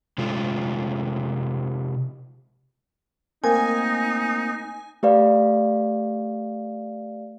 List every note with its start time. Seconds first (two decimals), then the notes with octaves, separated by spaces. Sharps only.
0.18 C3 G#3 F4 A4
3.44 A3 A#3 C4 D#4 A#4 G#5
5.03 A3 G4 B4 D5 F5